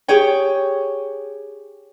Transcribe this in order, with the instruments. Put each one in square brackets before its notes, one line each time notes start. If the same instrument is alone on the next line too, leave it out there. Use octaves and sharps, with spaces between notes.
[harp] G4 G#4 C#5 G5